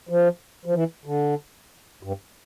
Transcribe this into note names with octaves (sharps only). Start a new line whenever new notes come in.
F3
F3
E3
D3
G2